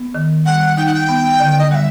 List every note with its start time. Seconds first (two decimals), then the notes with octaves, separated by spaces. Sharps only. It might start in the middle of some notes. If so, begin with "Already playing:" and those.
Already playing: B3
0.15 D#3
0.46 G3 F#5
0.77 D#4 G5
0.86 F#5
0.94 G5
1.09 B3
1.40 D3
1.59 D#5
1.70 G3 E5 F#5